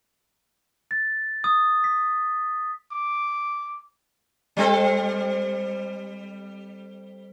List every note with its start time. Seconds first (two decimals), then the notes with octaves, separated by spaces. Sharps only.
0.91 A6
1.44 D#6
1.84 B6
2.92 D6
4.57 G3 C4 A4